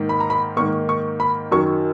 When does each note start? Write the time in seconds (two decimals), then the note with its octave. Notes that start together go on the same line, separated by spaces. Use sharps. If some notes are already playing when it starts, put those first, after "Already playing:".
Already playing: G#2 D#3 A#3
0.09 B5
0.20 A#5
0.30 B5
0.57 G#2 D#3 A#3 C#6
0.89 C#6
1.20 B5
1.52 F#2 D#3 F#3 C#6